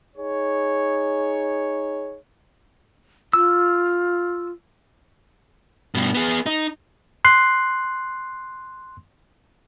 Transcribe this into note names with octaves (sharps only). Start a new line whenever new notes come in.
D#4 G#4 C#5
F4 E6
G2 B2
B3 G#4
D#4
C6 F#6 C7